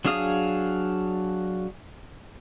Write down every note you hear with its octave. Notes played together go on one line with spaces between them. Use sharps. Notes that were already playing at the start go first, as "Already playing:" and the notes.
F#3 D4 G#4 F5 D#6